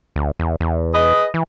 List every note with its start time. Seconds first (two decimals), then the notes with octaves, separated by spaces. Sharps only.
0.16 D2
0.39 E2
0.60 E2
0.94 G#4 B4 D#5
1.34 E3